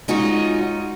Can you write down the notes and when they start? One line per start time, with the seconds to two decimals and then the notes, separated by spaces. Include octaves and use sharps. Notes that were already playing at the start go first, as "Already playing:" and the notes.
0.08 G#3 C#4 D#4 F4 F#4